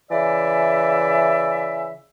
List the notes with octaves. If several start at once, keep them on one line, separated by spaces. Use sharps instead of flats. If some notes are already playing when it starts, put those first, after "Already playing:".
C#3 E3 D5 E5